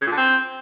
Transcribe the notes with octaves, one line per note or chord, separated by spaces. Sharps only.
C#3
A#2
D3
C4